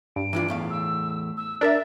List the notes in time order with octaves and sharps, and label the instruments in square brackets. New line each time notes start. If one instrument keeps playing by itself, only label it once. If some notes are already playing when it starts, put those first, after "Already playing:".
[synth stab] G2 [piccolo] D7
[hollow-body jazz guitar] E3 D4 F4
E2 A2 F5
[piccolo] E6
E6
[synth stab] D4 A#4 E5 [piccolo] A6